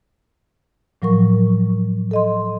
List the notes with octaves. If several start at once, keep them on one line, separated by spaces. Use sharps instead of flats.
A2 F3 F#3 A#4 C#6
A4 D#5 C6